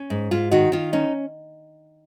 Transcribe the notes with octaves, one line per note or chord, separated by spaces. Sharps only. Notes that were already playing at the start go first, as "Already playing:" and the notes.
Already playing: C#4
G#2
G#2 F4
D#3 D#4 F#4
D#3 F4
C#4 D#4